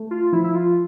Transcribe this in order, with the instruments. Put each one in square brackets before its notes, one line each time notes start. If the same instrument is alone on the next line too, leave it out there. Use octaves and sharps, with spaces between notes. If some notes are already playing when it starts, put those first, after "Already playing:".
Already playing: [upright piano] A3
[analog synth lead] F4
[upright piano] F3 [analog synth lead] E4
[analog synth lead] E4
F4